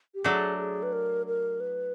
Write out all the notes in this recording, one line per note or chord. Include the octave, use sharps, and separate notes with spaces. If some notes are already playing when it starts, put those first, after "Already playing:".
G4
F#3 A3 D4 G#4
G#4
B4
A#4
A#4
B4